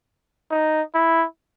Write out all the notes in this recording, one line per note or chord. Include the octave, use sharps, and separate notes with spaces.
D#4
E4